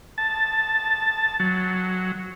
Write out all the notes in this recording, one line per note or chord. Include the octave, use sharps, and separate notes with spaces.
A5
F#3